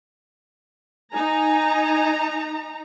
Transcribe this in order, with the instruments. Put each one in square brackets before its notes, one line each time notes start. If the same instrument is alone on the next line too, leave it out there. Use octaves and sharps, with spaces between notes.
[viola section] D#4 A#5 [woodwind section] G#5